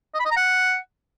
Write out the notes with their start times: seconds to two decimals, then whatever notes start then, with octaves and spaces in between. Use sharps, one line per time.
0.14 D#5
0.20 B5
0.25 D#5
0.31 A#5
0.37 F#5